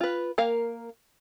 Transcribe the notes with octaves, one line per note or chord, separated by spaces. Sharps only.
F4 B4
A#3 A#4 F5